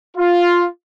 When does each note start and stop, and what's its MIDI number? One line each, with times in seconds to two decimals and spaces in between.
0.16 0.65 65